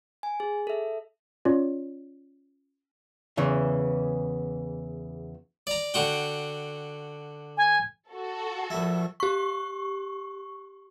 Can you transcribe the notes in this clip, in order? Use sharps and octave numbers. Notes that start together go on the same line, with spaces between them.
G#5
G#4
A4 E5
C#4 F4 C#5 D5
E2 C#3 E3
D5 A#5
D3 F#4 G5
G#5
F#4 A4
A#1 E4
G4 C#6